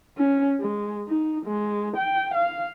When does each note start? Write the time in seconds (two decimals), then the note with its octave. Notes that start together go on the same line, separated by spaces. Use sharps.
0.18 C#4
0.61 G#3
1.08 D#4
1.46 G#3
1.97 G5
2.34 F5